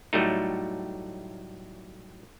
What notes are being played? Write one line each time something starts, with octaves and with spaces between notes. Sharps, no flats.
A2 F#3 G3 A3 D#4